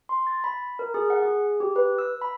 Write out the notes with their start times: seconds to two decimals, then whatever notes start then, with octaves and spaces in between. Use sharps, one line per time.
0.09 C6
0.27 A6
0.44 B5
0.79 A#4
0.94 G#4
1.10 F#5
1.23 G#4
1.60 G4
1.76 B4
1.98 E6
2.21 B5